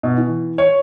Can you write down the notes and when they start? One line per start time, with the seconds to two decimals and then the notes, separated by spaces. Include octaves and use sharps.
0.03 B2
0.17 E3
0.58 C#5